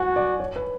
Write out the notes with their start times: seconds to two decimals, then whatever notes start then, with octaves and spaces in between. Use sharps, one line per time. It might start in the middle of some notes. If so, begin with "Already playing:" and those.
Already playing: F#4 F#5 G#5
0.16 D5
0.40 C#5
0.56 B4